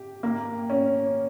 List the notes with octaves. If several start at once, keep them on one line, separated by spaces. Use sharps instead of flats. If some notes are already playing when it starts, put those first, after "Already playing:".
Already playing: G4
A#3
C#4